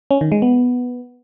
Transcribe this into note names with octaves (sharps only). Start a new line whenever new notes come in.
C#4
D#3
G#3
B3